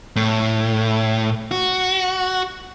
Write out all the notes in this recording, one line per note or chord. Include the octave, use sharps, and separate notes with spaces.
A2
F#4